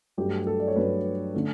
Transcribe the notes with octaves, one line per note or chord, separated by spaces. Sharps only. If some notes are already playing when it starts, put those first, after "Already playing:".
G2 F#3 A3 G4
A4
D5
C#5
G2 F#3 A3 B4
D3 A3